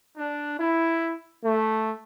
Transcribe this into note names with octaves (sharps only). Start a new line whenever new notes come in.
D4
E4
A3